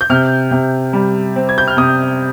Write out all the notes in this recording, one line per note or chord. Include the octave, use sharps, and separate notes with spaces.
G6
C3 F6
C3
G3
C4
G#6
G6
F6
C3 D#6